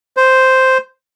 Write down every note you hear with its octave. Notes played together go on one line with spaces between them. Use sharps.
C5